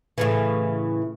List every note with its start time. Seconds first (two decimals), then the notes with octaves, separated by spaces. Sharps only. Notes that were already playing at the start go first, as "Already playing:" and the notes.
0.18 A2 C#3 E3